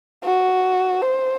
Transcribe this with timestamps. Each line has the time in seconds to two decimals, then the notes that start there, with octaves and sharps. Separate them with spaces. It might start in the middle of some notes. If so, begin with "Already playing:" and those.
0.24 F#4
1.02 C5